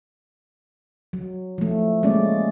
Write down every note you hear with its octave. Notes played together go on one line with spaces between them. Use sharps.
F#3
F3 A3
G#3 A#3 C#4 D5